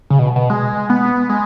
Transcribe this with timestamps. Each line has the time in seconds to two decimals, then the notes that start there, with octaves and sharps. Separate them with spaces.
0.10 C#3
0.19 B2
0.36 B2
0.50 G#3
0.90 B3
1.29 G#3